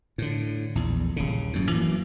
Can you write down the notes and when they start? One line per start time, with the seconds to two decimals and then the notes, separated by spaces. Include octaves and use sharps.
0.18 A2 D3
0.75 A#1 E2
1.16 D#1 C#3
1.53 F#2 A2
1.71 E3 F#3 A3 A#3